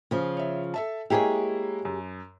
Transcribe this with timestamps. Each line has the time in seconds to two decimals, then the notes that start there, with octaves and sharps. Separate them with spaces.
0.11 C#3 F3
0.37 C#5 E5
0.74 A4 E5 A5
1.10 G#3 A#3 E4 G4 G#4 C#5
1.85 F#2